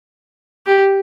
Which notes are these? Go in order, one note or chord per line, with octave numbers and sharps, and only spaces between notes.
G4